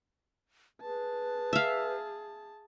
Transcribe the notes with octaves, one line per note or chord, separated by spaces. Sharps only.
G#4 B4 A5
E5 F5